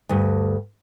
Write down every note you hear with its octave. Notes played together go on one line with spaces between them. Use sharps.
D2 G2